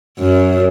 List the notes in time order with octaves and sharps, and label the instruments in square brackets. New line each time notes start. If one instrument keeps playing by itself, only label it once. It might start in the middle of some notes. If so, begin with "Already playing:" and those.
[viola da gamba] F#2